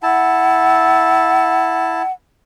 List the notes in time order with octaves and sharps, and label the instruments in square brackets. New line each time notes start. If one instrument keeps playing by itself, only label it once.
[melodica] E4 A5 [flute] F#5